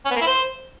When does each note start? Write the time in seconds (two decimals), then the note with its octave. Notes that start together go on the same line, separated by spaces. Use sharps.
0.05 C#4
0.11 B3
0.16 A#3
0.21 E4
0.27 C5